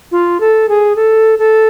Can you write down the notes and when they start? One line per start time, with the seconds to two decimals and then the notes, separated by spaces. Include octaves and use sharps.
0.12 F4
0.40 A4
0.69 G#4
0.96 A4
1.39 A4